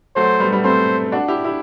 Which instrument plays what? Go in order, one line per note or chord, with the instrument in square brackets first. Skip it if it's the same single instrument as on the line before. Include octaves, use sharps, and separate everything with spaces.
[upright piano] F#3 A3 [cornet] C5
[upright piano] G3 B3
G3 B3
[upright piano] A3 C4 [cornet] C5
[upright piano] D4 F#4
E4 G4
E4 G4